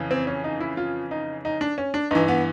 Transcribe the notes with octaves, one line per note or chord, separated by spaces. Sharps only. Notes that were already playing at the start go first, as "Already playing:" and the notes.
Already playing: F2 C#3 E3
C4
C#4
D#4
E4
F4
D#4
D#4
D4
C#4
D4
G2 E3 D#4
B3